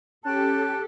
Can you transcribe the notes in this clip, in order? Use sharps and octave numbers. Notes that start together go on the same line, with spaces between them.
C#4 G4 A4 G5 A5 F#6